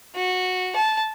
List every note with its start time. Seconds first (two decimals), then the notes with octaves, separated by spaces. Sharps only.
0.15 F#4
0.76 A5